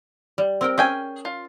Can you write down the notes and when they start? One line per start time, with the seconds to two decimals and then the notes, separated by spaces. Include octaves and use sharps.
0.38 G3
0.61 C4 A#4 G5
0.78 C#4 G#4 G5 G#5
1.25 F4